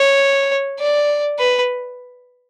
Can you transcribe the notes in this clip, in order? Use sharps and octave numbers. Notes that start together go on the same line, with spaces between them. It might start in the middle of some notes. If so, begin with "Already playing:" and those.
Already playing: C#5
D5
B4